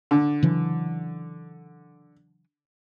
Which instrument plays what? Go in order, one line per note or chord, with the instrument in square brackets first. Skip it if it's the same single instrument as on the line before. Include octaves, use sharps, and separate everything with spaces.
[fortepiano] D3
[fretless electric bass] C#3 E3 F#3